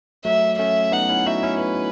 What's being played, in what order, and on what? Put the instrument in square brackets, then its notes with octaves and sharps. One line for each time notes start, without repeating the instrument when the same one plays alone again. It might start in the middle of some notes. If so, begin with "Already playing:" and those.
[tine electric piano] F#3 A3 [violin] E5
[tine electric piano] A3 C#4 [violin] E5
[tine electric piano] B3 D#4 [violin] F#5
[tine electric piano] C#4 E4
[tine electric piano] D#4 F#4 [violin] E5
[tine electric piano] C#4 E4
[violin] B4